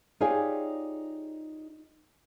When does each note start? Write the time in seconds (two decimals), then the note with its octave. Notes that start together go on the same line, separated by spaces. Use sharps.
0.20 D#4 F4 G4 G#4 C#5 D5